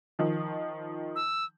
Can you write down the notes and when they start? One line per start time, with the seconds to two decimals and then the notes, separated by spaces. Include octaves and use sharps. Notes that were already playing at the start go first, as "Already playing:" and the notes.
0.19 D#3 F3
1.16 E6